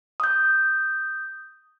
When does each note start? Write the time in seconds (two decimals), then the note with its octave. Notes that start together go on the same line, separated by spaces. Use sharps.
0.20 D#6 G6